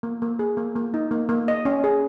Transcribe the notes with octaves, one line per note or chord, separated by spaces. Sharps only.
A#3
A#3
G#4
A#3
A#3
D#4
A#3
A#3
D#5
C#4
G#4